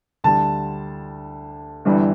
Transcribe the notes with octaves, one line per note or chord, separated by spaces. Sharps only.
D2 D3 G3 A5
G1 G2 E3 G3